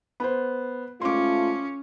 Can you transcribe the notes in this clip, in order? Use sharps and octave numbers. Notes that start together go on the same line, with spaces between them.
B3 C5
G#2 A3 C#4 F4 C6 D6